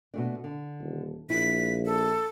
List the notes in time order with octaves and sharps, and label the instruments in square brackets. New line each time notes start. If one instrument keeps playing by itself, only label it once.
[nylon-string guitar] B2 A3 D4
D3
[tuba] D#1
[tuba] A#1 [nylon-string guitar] E4 [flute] B6
[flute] A4